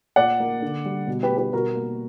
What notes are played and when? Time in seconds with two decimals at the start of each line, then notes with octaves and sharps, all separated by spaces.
0.16 A#2 D5 F#5
0.40 A#3
0.62 D3
0.85 G3
1.07 B2
1.23 G4 B4
1.31 G3
1.38 G4 B4
1.53 B2 F#4 A#4
1.76 A#3